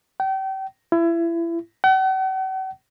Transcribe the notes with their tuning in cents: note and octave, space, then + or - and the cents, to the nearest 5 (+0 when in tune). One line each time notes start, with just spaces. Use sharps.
G5 -35
E4 +30
F#5 +45